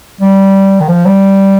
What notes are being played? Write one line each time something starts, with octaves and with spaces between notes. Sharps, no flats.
G3
D#3
F3
G3